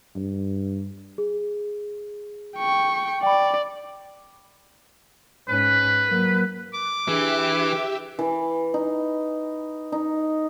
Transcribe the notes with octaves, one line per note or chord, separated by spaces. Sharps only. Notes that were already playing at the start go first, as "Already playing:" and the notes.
G2
G#4
G5 C#6
D5 G5 B5
G#2 C#4 B4
F#3 A#3
D6
E3 D4 G4 G#4 E5
E3
D#4
D#4